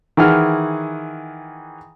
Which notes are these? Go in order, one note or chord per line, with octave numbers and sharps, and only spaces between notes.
D#3 E3 G#4 F#5 F6